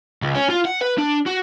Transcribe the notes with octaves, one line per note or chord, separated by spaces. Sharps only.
C#2
C#4
F4
F#5
B4
D4
F#4